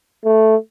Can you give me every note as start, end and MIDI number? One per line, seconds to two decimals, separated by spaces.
0.25 0.56 57